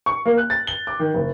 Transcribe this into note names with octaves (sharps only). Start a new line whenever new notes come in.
C#6
A#3
F#6
A6
G7
D6
D#3
F#1